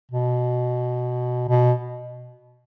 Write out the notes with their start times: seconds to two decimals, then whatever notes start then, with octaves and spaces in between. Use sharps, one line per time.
0.12 B2
1.49 B2